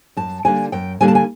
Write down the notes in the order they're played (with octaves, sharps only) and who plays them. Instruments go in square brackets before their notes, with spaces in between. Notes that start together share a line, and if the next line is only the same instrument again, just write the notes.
[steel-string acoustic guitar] F#2 A5
D3 G3 A#3 D4 G#5
F#2 G5
D3 G3 A#3 D4 G#5
A5
G#5